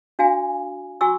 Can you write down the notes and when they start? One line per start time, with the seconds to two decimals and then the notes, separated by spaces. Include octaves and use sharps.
0.19 D4 F#4 F5 G#5
1.01 F#4 G#5 C#6 E6